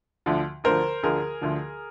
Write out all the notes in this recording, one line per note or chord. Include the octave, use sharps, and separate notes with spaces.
D2 D3 F3
D2 D3 F3 A#4 C5
D2 D3 F3 G#4 A#4
D2 D3 F3